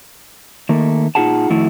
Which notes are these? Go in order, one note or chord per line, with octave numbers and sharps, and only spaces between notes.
D#3 A3 A#3
A#2 D#4 F4 G#4 F#5 A5
F2 D#3 A3 E4 F#4